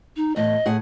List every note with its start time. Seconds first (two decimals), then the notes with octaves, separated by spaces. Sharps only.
0.17 D#4
0.36 E2 A2 D#5
0.66 A2 G#4 F#5